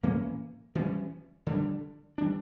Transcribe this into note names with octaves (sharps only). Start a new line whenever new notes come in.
A2 E3 A#3 C#4
E3 G3 C#4
D3 G3 D4
E3 G3 D4